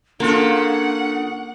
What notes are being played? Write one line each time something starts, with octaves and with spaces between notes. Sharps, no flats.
C#3 A#3 D4 F4 A4 F#5